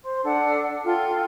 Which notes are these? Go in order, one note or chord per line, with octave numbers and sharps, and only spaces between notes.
C5 C6
D4 A4 F#5
F4 A4 G5